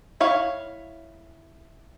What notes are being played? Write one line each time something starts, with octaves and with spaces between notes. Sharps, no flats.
E4 C#5 F5